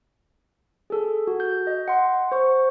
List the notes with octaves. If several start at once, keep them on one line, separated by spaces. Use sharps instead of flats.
G#4 A4
F#4
G6
D#5
F#5 C6
C5 C#6